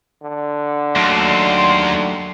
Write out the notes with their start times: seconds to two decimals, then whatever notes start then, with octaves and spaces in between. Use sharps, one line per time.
0.23 D3
0.96 D#2 F#3 A3 C6